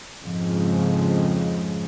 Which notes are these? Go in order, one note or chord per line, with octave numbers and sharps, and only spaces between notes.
F2 G#2 C#3 F3 G#3